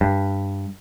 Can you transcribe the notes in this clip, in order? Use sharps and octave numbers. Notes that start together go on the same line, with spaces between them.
G2